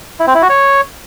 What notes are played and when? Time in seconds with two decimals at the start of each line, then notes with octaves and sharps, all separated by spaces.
0.20 E4
0.27 C4
0.35 E4
0.42 F#4
0.50 C#5